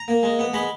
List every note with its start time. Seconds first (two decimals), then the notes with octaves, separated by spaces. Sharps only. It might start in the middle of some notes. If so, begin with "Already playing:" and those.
Already playing: A#5
0.08 A#3
0.23 G#3
0.39 B3
0.54 G#3 B5